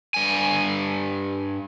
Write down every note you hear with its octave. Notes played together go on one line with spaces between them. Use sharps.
G2 G#5